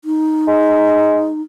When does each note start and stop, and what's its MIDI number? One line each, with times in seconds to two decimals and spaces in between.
0.05 1.41 63
0.48 1.28 56